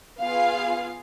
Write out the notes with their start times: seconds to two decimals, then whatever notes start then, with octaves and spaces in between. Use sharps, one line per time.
0.20 B3 F4 G#4 F5